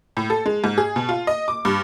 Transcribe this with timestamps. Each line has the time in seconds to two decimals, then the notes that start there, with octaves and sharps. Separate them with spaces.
0.17 A2
0.30 A4
0.46 G#3
0.64 G#2
0.78 G#4
0.96 B2
1.09 F4
1.27 D#5
1.48 D6
1.65 G2